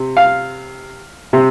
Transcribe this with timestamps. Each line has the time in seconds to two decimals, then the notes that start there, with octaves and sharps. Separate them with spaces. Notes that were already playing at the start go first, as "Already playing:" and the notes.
Already playing: C3
0.17 F5
1.33 C3